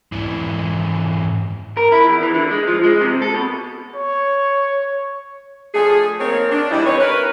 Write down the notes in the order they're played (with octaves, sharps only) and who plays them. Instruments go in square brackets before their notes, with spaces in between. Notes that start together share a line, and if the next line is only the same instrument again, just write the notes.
[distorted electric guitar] G#2 E3
[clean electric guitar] A#4
E4
E2
E3
D3
G#3
F3
G#3
C3
A4
B2
[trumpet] C#5
[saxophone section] F3 A3 D4 G#4
A#3 C4 D#4 A#4 C#5
D4
G2 E3 G3 G#3 D#4 E4
E3 C4 B4 C#5
A#4 B4